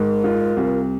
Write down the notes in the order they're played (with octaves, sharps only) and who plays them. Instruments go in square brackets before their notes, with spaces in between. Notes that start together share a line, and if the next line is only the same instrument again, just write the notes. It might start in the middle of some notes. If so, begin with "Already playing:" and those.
Already playing: [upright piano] G#2 [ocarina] A#4
[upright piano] F4
C2